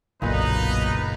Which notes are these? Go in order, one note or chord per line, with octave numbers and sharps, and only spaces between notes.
F#1 B1 A#2 D#4 B4